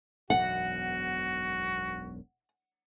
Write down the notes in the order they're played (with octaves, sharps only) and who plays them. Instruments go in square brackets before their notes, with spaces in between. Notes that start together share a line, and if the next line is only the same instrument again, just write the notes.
[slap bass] E1 B1 F#2 [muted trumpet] F#4 [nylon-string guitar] F#5